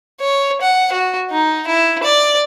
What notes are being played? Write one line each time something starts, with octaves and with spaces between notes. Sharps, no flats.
C#5
F#5
F#4
D#4
E4
D5